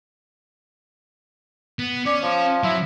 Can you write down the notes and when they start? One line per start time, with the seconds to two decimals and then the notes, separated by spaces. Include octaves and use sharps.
1.79 B3
2.06 C#4 D5
2.22 F3
2.64 F#3 E4